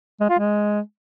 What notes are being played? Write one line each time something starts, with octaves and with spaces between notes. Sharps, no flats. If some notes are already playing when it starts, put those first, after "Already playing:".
G#3
F4
G#3